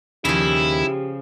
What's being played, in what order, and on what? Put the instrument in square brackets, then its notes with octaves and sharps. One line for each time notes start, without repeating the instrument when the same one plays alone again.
[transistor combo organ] D#2 [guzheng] C#3 F3 [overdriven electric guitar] E4 [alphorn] G4